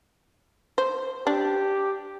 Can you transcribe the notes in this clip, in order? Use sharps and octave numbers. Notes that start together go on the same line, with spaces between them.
C5
D4 G4